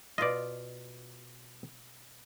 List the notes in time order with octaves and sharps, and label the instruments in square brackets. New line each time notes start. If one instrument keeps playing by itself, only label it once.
[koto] B2 F4 [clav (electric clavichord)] D5 D#5